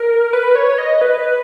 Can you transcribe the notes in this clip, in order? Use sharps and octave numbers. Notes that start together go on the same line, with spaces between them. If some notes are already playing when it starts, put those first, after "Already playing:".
Already playing: A#4
B4
C#5
D#5
B4